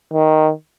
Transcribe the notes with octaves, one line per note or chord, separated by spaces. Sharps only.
D#3